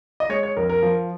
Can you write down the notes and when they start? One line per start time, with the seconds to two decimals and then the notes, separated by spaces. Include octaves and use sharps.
0.20 D#5
0.29 G#3 C#5
0.43 C#5
0.57 F2 A#4
0.69 A#4
0.83 F3